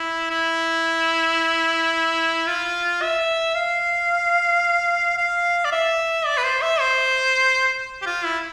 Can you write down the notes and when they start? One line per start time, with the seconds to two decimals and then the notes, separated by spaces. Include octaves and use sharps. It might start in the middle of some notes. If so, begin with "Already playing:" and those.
Already playing: E4
0.31 E4
2.47 F4
3.02 E5
3.55 F5
5.18 F5
5.65 D5
5.72 E5
6.26 D5
6.38 B4
6.43 C5
6.62 E5
6.80 C5
8.02 G4
8.06 F4
8.24 E4